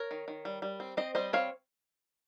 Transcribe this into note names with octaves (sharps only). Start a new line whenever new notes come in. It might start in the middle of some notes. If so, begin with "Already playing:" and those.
Already playing: A#4 C#5
D#3
D#3
G3
G3
C4
C4 C5 D#5
G3 C5 D#5
C4 C#5 F5